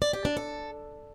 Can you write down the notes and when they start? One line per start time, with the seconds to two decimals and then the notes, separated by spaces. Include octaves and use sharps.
0.02 D5
0.13 G4
0.25 D4
0.37 A4